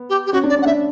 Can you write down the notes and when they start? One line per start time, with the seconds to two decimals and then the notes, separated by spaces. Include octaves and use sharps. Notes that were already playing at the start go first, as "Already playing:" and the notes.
Already playing: B3
0.10 G4
0.27 G4
0.33 C#4 F#4
0.44 D4
0.50 D5
0.55 C#4
0.62 F#5
0.66 D4 E5